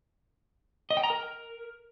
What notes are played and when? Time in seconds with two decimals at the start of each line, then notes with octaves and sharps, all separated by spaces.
0.90 D#5
0.97 G5
1.04 A#5
1.10 A#4